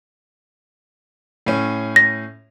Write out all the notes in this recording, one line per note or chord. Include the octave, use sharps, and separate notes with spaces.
A2 C#4
A#6